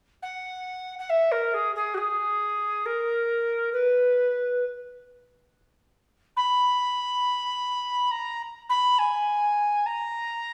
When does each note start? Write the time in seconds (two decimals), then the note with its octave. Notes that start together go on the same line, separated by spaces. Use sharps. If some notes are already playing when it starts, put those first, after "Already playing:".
0.22 F#5
0.99 F#5
1.09 E5
1.31 A#4
1.53 G#4
1.75 G#4
1.94 F#4
1.97 G#4
2.85 A#4
3.72 B4
6.36 B5
8.11 A#5
8.69 B5
8.98 G#5
9.86 A#5